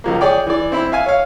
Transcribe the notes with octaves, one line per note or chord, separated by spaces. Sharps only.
C#2 F3 A#3
G#4 C#5 D5 G5
E3 D5
C4 E4 B5
E5 F5 G#5
C#5 F5